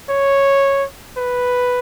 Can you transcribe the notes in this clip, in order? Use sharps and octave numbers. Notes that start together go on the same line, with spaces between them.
C#5
B4